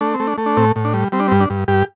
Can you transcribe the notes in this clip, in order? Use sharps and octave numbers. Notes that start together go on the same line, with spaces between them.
A3 D4
C4
A3
D4
A3
D4
A2 C4
A2
D4
G3
G3 C4
D4
C4
G2
D4
G2
G2 G4